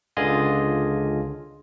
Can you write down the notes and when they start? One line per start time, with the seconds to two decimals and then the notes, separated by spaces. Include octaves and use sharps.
0.17 C#2 D3 F4 G#4 D#5 G#5